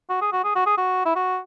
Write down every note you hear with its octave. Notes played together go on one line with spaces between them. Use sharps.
F#4
G#4
F#4
G#4
F#4
G#4
F#4
E4
F#4